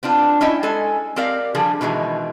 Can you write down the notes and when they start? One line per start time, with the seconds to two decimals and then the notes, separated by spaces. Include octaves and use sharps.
0.03 B3 C4 D4 F4
0.41 C#4 E4 D#5 G5
0.63 G#3 A4 G#5
1.16 C4 G4 A#4 D5 F5
1.55 D3 F3 G3 G#4
1.81 B2 D#3 E3 G#3